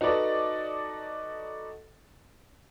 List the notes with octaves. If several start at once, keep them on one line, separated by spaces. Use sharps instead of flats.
D#4 F#4 A4 B4 D5 D#5